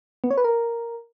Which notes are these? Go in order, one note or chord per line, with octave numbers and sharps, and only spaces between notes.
B3
C#5
B4
A#4